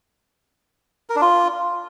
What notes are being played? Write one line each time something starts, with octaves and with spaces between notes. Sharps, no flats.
A#4
D4
F4